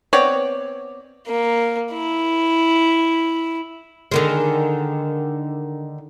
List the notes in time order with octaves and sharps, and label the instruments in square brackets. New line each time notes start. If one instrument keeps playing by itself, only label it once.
[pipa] B3 C4 C#5 D5
[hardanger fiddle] A#3
E4
[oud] D3 D#3 G#3